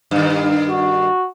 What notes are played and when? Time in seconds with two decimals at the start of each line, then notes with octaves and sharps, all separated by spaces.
0.11 G2 D#3
0.69 F#4